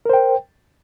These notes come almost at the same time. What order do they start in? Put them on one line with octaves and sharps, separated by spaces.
A#4 C5 G5